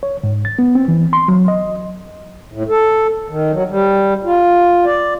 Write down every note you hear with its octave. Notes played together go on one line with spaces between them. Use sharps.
C#5
G#2
A6
B3
C4
E3
C6
F#3
D#5
A2
A4
D#3
F#3
G3
F4
D5